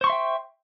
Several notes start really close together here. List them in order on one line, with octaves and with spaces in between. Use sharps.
C5 C#6 C6 E5 G5